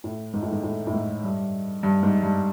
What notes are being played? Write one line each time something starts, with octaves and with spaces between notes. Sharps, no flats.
A2
G#2
A2
G#2
A2
A2
G#2
G2
G2
G#2
G2